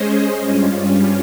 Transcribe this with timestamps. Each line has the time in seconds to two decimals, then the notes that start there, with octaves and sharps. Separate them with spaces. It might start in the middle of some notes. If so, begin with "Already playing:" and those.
Already playing: G#3 C#4 G#4 C5 D#5
0.38 G2 G3 C#4 F4